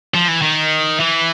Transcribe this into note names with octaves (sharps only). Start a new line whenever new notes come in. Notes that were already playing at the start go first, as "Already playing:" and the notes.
F3
E3
D#3
E3